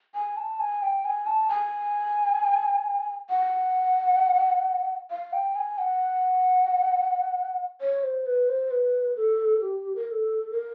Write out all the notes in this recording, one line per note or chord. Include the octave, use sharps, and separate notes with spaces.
G#5
A5
G#5
G5
G#5
A5
G#5
F#5
F5
G5
G#5
F#5
C#5
C5
B4
C5
B4
A4
G4
A#4
A#4
A4
A#4